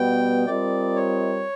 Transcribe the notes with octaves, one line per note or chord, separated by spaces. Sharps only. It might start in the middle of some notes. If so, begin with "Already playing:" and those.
Already playing: B2 G3 B3 G5
G3 C4 F4 A#4 D5 D#5
C#5